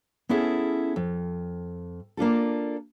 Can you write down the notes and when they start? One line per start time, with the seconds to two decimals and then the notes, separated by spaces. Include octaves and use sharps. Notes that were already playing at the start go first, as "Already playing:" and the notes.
0.29 B3 C#4 E4 G#4 A4
0.96 F2
2.17 A#3 D4 F4 A4